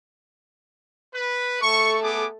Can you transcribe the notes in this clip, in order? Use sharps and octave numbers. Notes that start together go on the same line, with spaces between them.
B4
A3 A4 C#6
B3 G#4 D6